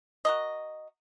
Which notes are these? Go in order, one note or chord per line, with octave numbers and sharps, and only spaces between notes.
F#4 A#4 D#5